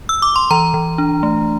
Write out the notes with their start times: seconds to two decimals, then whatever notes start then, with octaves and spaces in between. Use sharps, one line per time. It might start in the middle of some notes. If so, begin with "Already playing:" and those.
0.09 E6
0.22 D6
0.36 C6
0.51 E3 A#5
0.74 E3
0.98 D4
1.23 A3